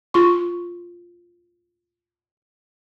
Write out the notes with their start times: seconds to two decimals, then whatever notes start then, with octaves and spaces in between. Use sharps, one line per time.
0.14 F4 C6 C#6